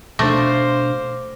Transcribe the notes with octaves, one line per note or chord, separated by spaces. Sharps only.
B2 A3 D4 C5 F5 D6 A#6